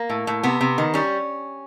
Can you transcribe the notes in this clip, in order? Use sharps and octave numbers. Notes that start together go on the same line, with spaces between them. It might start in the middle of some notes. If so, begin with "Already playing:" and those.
Already playing: A#3
A2
A2
C3 B3
C3
D#3
G3 C#4